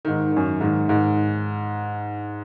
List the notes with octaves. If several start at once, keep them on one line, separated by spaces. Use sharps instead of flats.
G#2 D#3
F#2 D#3
G#2 D#3
G#2 D#3